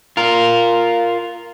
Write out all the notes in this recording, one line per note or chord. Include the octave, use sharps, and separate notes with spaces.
F4 A#4